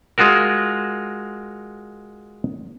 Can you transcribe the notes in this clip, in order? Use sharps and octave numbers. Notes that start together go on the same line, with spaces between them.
G#3 F4 F#4 A#4